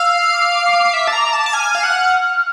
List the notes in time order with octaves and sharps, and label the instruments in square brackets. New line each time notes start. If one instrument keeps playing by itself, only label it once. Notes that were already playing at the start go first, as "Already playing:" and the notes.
Already playing: [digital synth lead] F5 [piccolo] E6
[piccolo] D6
[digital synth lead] E5
A5
A#5
A5
A5
[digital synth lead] G#5 [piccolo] F6
[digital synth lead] F5
F#5